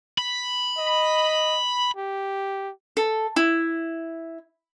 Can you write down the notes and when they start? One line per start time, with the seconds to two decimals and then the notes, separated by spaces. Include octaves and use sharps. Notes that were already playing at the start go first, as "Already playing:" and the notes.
0.18 B5
0.78 D#5
1.97 G4
2.97 A4
3.36 E4